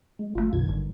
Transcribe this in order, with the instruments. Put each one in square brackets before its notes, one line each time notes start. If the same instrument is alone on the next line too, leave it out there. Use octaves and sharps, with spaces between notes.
[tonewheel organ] G#3
[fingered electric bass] G1 C#3 A3 [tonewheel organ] F4
[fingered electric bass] B1 B2 D3 [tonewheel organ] F#2 D#3 G#6
[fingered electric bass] G#1 G2 D3 [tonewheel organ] D#3